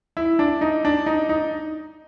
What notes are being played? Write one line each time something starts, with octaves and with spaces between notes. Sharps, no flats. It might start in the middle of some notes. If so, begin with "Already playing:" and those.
E4
D4
D#4
D4
D#4
D#4